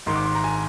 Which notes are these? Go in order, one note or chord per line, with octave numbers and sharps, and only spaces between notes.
G#1 G#2 D#3 C6
D6
C6
A#5
G#5